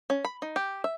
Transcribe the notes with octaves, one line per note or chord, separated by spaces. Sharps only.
C#4
B5
D#4
G4
E5